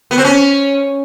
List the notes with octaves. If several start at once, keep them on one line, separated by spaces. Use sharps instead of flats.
B3
C4
C#4